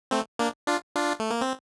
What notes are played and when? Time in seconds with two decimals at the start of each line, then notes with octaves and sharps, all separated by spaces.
0.11 A3 C4
0.39 A#3 D4
0.67 D4 F4
0.96 D4 F4
1.20 A3
1.31 A#3
1.41 C4